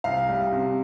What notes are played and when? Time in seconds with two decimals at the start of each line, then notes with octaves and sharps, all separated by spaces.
0.04 C2 F5
0.29 G3
0.52 C3